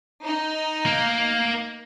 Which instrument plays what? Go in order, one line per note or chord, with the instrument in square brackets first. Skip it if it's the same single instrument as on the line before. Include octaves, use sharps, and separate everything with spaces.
[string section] D#4
[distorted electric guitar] A#3